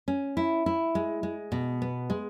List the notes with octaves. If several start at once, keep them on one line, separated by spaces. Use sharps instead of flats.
C#4
E4
E4
G#3
G#3
B2
B3
G#3